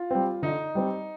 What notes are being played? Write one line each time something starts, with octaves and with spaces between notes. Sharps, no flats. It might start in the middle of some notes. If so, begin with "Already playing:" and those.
Already playing: F4
G3 C4
D3 D#4
G3 C4